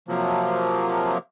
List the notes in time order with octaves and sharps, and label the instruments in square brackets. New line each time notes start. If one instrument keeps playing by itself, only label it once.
[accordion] C3 F3 F#3 A#3